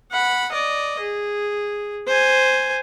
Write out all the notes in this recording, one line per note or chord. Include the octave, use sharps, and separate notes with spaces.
F#5 B5
D5 D#5
G#4
C5 G#5